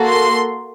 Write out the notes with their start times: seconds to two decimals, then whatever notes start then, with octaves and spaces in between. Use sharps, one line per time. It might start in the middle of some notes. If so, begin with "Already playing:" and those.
Already playing: A#3 F#4 A4
0.08 C6